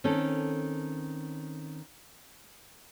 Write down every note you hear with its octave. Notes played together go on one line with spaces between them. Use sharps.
D#3 C4 C#4 A4